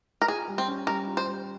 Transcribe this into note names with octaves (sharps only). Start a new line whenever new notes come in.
A#4
F4 G#4
G3
C4
C#4
G3 A#4
F4
C5
G3